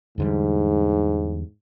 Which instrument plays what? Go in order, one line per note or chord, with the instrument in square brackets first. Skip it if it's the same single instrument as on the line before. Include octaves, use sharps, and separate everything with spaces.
[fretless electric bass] E2 D3 G3 [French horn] G#2